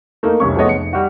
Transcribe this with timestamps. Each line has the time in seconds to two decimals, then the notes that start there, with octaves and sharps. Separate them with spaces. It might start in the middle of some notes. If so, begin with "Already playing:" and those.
0.23 A3 A#3 D#4
0.40 F1 C2 C#4 C#6
0.56 F3 G#3 A3 B3 C#5 D#5
0.69 F1 C#7
0.93 G3 F#4